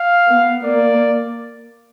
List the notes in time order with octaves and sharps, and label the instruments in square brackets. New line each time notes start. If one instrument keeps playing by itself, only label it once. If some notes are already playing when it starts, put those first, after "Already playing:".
Already playing: [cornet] F5
[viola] B3
[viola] A#3 [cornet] D5